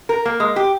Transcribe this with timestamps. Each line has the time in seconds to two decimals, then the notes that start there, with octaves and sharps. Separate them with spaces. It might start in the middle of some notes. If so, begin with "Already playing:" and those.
0.09 A#4
0.26 A#3
0.40 G#3
0.56 G4